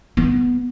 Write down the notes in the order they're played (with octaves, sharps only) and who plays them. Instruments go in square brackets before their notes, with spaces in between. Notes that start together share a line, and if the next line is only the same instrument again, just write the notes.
[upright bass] B3